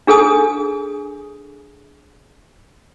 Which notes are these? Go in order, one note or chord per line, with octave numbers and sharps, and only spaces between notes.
D4 G#4 A4 G#5 D#6